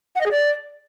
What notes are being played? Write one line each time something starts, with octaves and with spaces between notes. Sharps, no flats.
F#5
D#5
G#4
D5